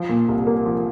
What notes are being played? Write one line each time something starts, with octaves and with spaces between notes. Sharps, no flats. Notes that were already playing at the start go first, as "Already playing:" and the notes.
Already playing: F3
A#2
C2
A#3
F3